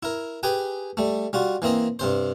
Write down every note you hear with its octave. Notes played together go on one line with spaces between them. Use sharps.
E4 A#4
G4 G#4 B4 G5 G#5
G3 A3
G3 F4 F#4
E3 A#3 C4 D#5
G2 C3 C5